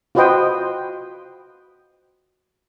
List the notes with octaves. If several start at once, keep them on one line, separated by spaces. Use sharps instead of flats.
F4 F#4 B4 C5 D#5 G5